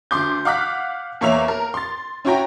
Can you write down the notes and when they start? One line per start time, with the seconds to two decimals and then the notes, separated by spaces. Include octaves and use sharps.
0.11 D2 C6 D6 G6
0.45 F5 F#5 D6 F6 F#6 B6
1.21 E2 A#3 C#5 E5 F7
1.48 A#4
1.74 C6 A6
2.25 C#4 E4 F#4 C#5 G5 A#5